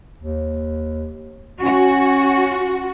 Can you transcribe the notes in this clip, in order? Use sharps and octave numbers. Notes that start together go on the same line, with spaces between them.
D#2
C#4 F#4